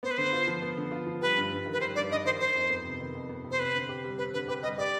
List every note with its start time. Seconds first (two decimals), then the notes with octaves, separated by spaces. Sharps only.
0.03 B3 C5
0.11 B4
0.18 D3 C5
0.33 F4
0.48 F3
0.62 B3
0.77 D3
0.92 F4
1.07 F3
1.22 G3 B4
1.37 G2
1.51 G2
1.66 D#3
1.73 B4
1.81 G3 C5
1.95 G2 D5
2.11 G2 D#5
2.25 D#3 C5
2.40 D#3 C5
2.55 F2
2.70 B3
2.85 C3
3.00 D#3
3.15 F2
3.29 B3
3.44 C3
3.51 C5
3.59 C4 B4
3.74 D3
3.89 G4
4.04 G3
4.18 C4 B4
4.33 D3 B4
4.48 G4 B4
4.63 G3 D#5
4.78 G4 D5